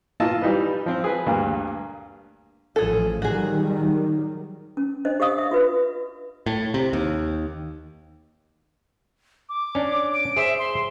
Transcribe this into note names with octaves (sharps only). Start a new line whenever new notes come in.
E3 A#3 F4 D#5 A5 E6
E3 G3 D#4 B4
F3 C4
G#4 B4
D2 G2 A#3
A1 A2 F3 G#4 A4
D#3 F#3 G3 F#4 G#4
C#4
D4 C5 D#5
G4 C5 D#5 F5 D#6
E5
F4 F#4 B4
A2
C3
D#2
D6
C#4 D4
D7
G#4 C5 E5
C6